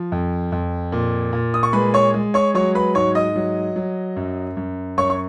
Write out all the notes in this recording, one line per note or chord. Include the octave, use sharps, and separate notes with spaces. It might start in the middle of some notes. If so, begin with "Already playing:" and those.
Already playing: F3
F2
F2
A#2
A#2
D#6
C#6
G#3 B4 B5
C#5 C#6
G#3
C#5 C#6
F#3 C#5 C#6
B4 B5
G#2 C#5 C#6
D#5 D#6
F#3
F#3
F#2
F#2
F#2 C#5 C#6
C#6